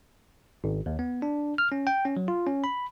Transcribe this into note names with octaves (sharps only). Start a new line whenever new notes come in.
G#1
D#2
B3
D4
F6
C#4
G5
C#4
F#3
F4
C#4
B5